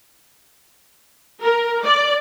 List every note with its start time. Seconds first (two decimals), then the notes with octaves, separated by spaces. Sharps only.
1.41 A#4
1.83 D5